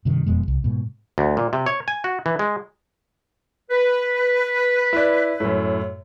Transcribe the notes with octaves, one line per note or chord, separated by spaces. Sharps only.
G2 C3 D#3
E1 F2 B2 G#3
C2
G#2 B2
D2
A#2
C3
C#5
G#5
F#4
E3
G#3
B4
E4 D5
F#2 A2